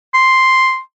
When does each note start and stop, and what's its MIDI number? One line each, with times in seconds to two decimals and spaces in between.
0.14 0.79 84